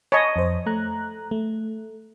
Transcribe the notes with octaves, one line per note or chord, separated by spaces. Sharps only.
C#5 D#5 G#5 A5 B5
F2 C5
A3 A#5 F#6
A3